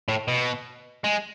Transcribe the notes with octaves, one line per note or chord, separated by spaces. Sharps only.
A2
B2
G#3